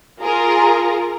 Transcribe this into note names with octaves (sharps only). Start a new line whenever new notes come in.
F4 G#4 A#4